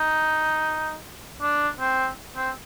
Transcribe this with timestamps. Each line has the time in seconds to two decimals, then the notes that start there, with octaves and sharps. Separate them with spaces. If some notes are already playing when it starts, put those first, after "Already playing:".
Already playing: D#4
1.42 D4
1.80 C4
2.37 C4